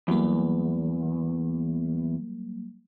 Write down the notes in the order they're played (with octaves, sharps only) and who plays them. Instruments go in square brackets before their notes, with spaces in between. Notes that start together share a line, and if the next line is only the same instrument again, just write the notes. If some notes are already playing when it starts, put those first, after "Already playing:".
[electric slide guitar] E2 [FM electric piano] F#3 G3 A#3